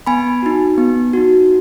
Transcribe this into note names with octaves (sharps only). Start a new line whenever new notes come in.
B3 G#5 B5
D#4 F#4
B3
D#4 F#4